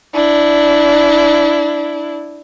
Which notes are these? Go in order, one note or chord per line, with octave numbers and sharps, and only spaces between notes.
D4 E4